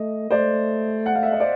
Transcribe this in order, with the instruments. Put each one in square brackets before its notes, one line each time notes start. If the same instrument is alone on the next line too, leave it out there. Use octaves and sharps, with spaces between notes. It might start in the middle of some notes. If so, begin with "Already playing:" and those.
Already playing: [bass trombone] A3 [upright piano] D#5
[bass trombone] A3 [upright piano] C5 D5
[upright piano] F#5
F5
E5
D#5
C5 D5